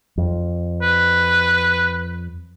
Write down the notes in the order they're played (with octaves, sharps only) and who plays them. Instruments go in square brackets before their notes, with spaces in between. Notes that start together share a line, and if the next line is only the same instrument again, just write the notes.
[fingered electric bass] F2
[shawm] B4